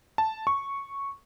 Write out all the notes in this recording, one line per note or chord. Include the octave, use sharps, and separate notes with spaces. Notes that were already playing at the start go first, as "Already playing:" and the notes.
A5
C#6